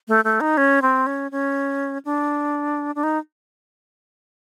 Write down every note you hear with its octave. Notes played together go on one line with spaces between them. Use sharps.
A3
A3
D#4
C#4
C4
C#4
C#4
D4
D4
D#4